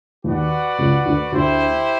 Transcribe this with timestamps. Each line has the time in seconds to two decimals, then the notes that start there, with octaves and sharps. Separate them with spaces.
0.24 D#2 D#3 F#4 B4 D5 F#5
0.79 C#2 C#3
1.05 D2 D3
1.32 D2 D3 E4 G4 C5